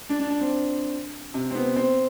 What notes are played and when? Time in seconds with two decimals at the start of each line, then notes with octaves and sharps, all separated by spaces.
0.09 D4
0.20 D4
0.30 D4
0.41 C4
1.34 C3
1.51 C4
1.55 B3
1.76 C4